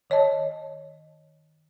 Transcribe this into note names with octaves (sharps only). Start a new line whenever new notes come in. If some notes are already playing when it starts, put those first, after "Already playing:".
D#3 C#5 D#5 A5